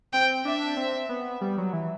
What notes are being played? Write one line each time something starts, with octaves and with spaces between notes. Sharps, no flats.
C4 G5
D4 E5
C4
B3
G3
F#3
E3